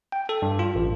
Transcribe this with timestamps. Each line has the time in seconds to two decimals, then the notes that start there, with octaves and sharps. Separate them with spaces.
0.12 G5
0.29 A4
0.42 G2
0.59 F4
0.75 A1